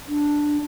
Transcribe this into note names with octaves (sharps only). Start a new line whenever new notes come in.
D4